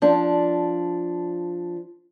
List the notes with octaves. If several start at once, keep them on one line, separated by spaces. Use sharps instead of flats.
F3 D4